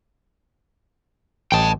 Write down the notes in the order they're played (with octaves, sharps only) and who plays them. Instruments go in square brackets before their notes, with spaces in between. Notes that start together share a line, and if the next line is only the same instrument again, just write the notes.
[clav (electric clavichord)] A1 D#5 [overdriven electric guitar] G5 A5